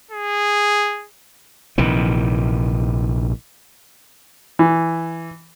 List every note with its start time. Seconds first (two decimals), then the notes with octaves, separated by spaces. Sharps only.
0.11 G#4
1.78 A#1 C3 D#3 E3
4.59 E3